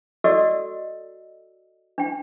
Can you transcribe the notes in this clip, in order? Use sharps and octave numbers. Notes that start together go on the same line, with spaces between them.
F#4 A4 D5 D#5 E6
D4 G5